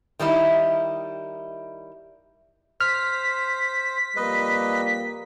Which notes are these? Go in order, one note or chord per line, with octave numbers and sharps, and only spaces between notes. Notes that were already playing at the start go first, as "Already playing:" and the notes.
D#3 G3 D#4 E4
C5 F6 B6
F2 G3 A#3 B4 D#5